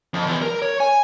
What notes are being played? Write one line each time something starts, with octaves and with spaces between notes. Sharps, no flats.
F2
E2
A#4
C#5
G#5